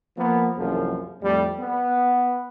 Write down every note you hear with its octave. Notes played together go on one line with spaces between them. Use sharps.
F3 A#3 B3
C2 F#2 E3 F3 A#3 G#4
F2 A2 G3
B3